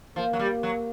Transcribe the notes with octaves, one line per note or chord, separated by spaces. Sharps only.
F3 A#3
F#3
G3
F#3